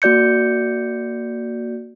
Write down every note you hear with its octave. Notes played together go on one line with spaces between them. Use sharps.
A#3 F#4 D5 G6 C#7